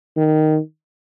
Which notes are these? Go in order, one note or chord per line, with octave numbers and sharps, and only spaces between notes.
D#3